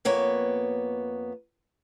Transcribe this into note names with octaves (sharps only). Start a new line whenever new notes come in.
F2 A#3 B3 C#5